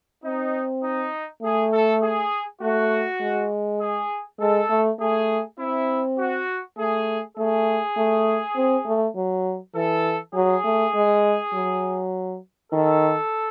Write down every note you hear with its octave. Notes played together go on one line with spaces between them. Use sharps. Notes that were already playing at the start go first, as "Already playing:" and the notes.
C4 D#4
D#4
A3 G#4
A4
G#4
A3 F#4
G#3
G#4
G#3 A4
A3
A3 G#4
C4 E4
F#4
A3 G#4
A3 G#4
A3
C4
A3
F#3
E3 A4
F#3 G#4
A3
G#3
F#3
D#3 A4